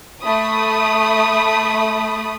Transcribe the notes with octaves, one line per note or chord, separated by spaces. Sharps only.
A3 B5 D#6